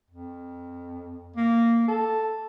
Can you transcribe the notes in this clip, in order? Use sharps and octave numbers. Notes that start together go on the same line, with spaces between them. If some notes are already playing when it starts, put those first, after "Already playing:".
F2
A#3
A4